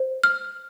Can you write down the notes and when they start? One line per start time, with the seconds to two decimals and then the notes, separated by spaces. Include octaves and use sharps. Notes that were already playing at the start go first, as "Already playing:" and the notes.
Already playing: C5
0.24 F6